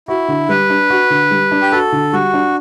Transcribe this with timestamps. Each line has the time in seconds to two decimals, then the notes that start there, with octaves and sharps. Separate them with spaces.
0.08 E4 F#4
0.28 D3
0.49 G3 B4
0.70 D4
0.90 F#4
1.10 D3
1.31 G3
1.51 D4
1.61 G4
1.72 F#4 A4
1.92 D3
2.13 G3 F#4
2.33 D4